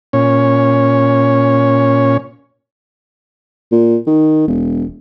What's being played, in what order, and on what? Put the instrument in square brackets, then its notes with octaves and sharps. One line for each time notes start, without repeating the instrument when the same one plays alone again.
[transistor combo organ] A#2 C#4 C#5
[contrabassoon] A#2
D#3
E1